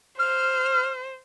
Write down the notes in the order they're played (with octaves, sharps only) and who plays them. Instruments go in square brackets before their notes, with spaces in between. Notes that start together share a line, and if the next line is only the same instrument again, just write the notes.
[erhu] C5 [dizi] F6